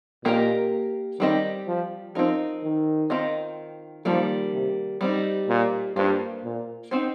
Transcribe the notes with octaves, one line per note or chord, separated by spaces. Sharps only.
A#2 A#3 G4 A#4 D#5
D#3 G3 C4 G4 D#5
F3
F3 C4 D#4 A#4
D#3
D#3 C4 F4 D#5
D#3 F3 G3 A#3
C3
G3 C4 D#4
A#2
G2 A#3 F4 C5
A#2
C4 D#4 C5